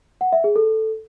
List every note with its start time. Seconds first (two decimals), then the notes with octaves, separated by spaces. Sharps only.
0.21 F#5
0.32 E5
0.44 G#4
0.56 A4